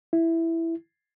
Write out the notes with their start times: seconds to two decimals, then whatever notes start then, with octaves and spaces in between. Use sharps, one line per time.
0.13 E4